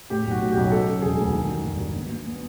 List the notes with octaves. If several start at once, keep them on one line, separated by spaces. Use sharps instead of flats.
A2 G4
B1 F#4
A2
G4
B1
F#3 A4
C#3
E1 G#4
D2
D#3
G3
G#1
G2
B3
B3
B3